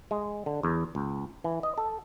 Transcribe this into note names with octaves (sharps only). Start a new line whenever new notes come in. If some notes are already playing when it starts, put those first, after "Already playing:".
G#3
D3
E2
C#2
E3
D#5
A4